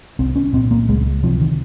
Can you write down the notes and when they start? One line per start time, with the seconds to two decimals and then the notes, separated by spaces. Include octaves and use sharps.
0.19 C2 C4
0.36 C#4
0.53 A#2 C4
0.71 A#3
0.88 C#2 G#3
1.23 C3 F3
1.40 D#3